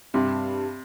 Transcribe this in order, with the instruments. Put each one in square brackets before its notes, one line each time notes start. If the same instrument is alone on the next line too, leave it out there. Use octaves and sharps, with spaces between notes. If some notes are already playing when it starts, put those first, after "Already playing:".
[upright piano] G2 [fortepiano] C3